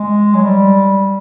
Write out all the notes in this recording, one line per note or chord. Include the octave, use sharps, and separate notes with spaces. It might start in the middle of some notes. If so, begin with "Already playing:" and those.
Already playing: G#3
F#3
G3